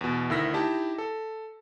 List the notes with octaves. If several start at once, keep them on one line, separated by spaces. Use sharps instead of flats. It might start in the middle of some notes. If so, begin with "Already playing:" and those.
E2 B2
D2 D#3 E4 E6 A#6 B6
D#4 E4 G4 A5
A4